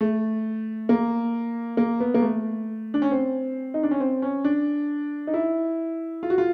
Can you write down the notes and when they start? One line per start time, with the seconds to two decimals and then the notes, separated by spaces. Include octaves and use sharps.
0.01 A3
0.89 A#3
1.77 A#3
2.00 B3
2.14 A#3
2.22 A3
2.94 D4
3.02 C#4
3.11 C4
3.74 D#4
3.83 D4
3.91 C#4
4.00 C4
4.22 C#4
4.44 D4
5.27 D#4
5.34 E4
6.23 F4
6.30 F#4
6.38 F4